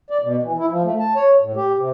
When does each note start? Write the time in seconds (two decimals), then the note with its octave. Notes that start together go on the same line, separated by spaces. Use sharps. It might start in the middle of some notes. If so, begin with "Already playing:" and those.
0.10 D5
0.23 B2
0.43 E3
0.58 E4
0.70 F3
0.84 A3
0.99 A5
1.16 C#5
1.41 A2
1.56 G4
1.78 C3